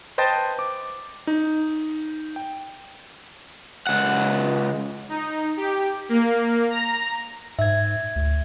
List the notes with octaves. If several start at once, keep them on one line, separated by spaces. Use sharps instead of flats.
B4 C5 D#5 G5 A5 A6
D6
D#4
G5
C#2 F#5
D#4
G4
A#3
A#5
G#2 E5 G#6
D2